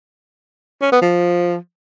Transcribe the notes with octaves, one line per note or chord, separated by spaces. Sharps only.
C#4
B3
F3